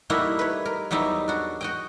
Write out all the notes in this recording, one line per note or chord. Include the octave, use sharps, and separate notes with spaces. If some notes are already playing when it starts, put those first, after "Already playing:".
G3 A3 A#3 D#4 E4 F#4
B4 C#5
A#4
E2 F#3 G3 D#4 E5
D4 F#4
F#4 D#5 G5